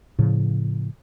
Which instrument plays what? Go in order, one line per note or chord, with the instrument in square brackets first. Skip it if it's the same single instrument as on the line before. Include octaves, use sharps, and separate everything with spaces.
[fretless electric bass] A2 C#3 F3